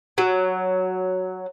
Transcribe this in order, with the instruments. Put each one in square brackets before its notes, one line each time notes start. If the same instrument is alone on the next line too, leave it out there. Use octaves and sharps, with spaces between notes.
[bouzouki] F#3